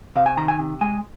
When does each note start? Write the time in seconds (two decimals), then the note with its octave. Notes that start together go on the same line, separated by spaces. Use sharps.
0.16 C3 F5
0.26 G#5
0.37 D#3 A#5
0.48 G#5
0.59 C3
0.81 G#3 G#5